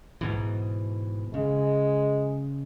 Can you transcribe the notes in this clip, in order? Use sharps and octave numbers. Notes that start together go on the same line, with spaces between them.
G#2 B2 E3
C#3 G#3